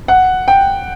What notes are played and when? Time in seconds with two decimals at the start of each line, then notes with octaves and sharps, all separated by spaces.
0.08 F#5
0.48 G5